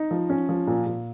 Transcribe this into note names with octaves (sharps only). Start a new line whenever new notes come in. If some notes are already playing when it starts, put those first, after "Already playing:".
Already playing: D#4
F3
C#4
F3
A#2
A#2